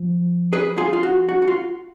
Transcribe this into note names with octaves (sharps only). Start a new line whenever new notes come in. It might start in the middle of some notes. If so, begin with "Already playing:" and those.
Already playing: F3
G#4 B4
F4 G#4
F4
F#4
F#4
F#4
F4